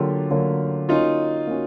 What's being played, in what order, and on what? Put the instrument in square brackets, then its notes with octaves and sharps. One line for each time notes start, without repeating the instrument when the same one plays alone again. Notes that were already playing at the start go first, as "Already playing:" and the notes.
Already playing: [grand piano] D3 F#3 A#3 [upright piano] F4 G4
[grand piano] D3 F#3 A#3
[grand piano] A#3 C#4 F#4 [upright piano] D#4 F4
[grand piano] A#3 C#4 F#4